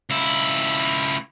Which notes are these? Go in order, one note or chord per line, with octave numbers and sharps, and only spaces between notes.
C#2 E4